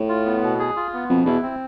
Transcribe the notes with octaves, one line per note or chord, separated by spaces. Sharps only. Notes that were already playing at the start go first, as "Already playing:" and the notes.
Already playing: A2
F4
B3
B2
G#4
F4
B3
F2 B2
E2 E4
C4